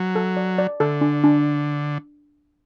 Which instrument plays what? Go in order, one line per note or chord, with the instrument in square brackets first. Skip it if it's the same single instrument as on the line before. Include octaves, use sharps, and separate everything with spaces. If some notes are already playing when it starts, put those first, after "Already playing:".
Already playing: [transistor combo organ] F#3
[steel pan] A4
D5
D5
[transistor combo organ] D3 [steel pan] A4
[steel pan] D4
D4